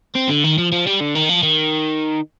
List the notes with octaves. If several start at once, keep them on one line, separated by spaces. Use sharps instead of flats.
C4
D3
D#3
F3
F3
G3
D3
D#3
F3
D#3